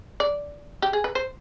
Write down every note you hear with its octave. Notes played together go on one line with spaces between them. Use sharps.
D5
G4
G#4
B4
C5